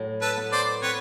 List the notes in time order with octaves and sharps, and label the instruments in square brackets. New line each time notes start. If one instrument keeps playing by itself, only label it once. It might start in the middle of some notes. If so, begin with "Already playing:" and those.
Already playing: [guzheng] A2 F#3
[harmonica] A4 B4
[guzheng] B3
[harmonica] C5 D5
[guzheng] C4 [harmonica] B4 C#5